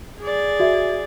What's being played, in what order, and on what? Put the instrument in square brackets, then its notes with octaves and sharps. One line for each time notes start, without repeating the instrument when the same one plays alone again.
[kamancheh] G#4 D5
[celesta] F#4 E5